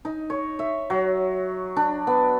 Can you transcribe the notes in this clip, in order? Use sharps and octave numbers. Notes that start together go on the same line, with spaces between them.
D#4
C#5
E5
F#3
D4
B3